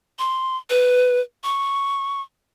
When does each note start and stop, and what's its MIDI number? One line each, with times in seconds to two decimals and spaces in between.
0.19 0.57 84
0.70 1.20 71
1.44 2.22 85